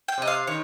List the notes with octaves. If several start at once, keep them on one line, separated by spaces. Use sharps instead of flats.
G5
C3 D#5
F5
D#3 C#5